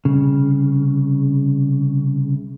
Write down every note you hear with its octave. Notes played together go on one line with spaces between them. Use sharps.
C2 C#3